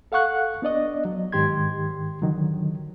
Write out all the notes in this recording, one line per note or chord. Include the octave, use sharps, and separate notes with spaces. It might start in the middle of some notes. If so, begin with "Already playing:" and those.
A4 F5 F#5 C#6 F#6
B3 D4 D5 D#5
F#3
G#2 D#3 G4 C6 G#6
D3 D#3 F#3